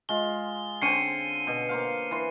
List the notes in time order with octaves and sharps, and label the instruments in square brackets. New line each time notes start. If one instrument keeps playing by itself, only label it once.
[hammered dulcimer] G#3 F4 [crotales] G7
[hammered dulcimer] D3 C4 C#4 [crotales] C7 C#7 D#7
[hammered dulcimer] B2
A#3 C5 F5
E3 B4 C6